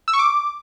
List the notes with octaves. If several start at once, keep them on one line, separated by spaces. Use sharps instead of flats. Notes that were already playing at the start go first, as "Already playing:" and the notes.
E6
C#6
D6